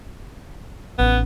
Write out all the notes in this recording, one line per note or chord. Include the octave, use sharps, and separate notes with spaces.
A1 B3 D#4